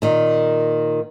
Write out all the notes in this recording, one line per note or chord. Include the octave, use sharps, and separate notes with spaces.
A#2 D#3